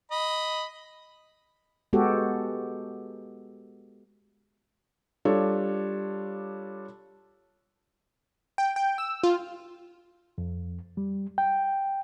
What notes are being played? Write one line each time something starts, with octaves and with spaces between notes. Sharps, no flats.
D#5 B5
G#3 B3 F#4 G4 A4
G3 D4 F4 A4 C#5
G5
G5
E6
F4
F2
G3
G5